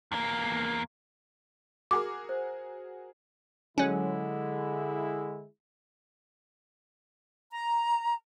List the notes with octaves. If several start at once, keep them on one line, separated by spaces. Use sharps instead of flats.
E2 A#3
F#4 G#4 A#4 D6
C5
D3 F#3 G#3 C#4 E4
A#5